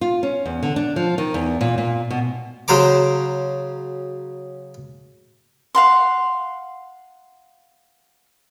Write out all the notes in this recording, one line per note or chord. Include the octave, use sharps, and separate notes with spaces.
F4
C#4
E2
D3
D4
F3
D#3
E2
A#2
A#2
B2
C#3 F#3 C5 A#5 D6
F5 F#5 C6